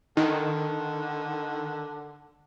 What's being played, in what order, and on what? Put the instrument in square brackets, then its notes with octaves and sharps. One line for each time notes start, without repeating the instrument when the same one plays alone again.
[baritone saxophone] D3 [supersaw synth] D#3